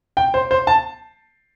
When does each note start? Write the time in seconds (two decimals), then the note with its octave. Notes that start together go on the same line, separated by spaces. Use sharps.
0.17 G5
0.34 C5
0.51 C5
0.67 A5